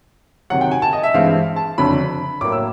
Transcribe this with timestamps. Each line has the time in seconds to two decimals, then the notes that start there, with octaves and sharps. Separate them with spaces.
0.50 C3 D#3 F#3 F#5
0.61 G5
0.71 G#5
0.82 A5
0.93 D#5
1.03 E5
1.14 G2 E3 G#3 C4 F5
1.56 A5
1.78 F#1 F2 D3 F#3 B5
2.41 A2 F#3 A#3 D6
2.52 E6